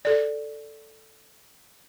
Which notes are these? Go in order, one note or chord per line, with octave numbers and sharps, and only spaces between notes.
A4 D5